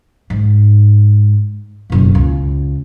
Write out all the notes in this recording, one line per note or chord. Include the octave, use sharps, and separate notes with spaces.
G#2
F#1 B2
C#2